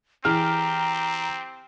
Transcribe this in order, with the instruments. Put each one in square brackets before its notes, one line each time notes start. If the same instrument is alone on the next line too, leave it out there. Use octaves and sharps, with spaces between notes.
[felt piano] E3 G#4 F6 [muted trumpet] C4 [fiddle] G4 [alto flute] A#5